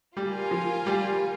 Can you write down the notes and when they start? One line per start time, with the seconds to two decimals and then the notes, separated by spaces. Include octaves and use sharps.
0.16 G3 F4 A#4 F5 G#5
0.51 F3
0.86 G3